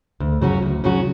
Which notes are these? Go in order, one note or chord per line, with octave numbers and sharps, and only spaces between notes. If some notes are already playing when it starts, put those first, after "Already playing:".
D2
C#3 F#3 C#4 F#4
D2
C#3 F#3 C#4 F#4